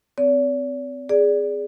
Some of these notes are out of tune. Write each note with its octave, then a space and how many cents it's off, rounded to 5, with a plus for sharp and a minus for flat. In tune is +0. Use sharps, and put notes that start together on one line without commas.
C4 -30 D5 -45
G#4 +0 D5 -10